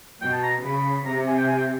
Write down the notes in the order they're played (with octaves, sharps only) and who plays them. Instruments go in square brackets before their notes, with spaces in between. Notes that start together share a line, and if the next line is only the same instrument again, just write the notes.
[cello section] B2 [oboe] G5
[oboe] A5
A#5
[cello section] C#3 [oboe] B5
[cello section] C3 [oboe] A#5
[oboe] G#5
G5
G#5
G5